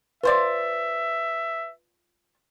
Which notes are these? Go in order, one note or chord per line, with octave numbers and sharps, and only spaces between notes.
F4 B4 C5 D5 E5